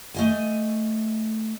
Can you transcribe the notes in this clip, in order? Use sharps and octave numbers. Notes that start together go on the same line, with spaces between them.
A3 D#5 G#5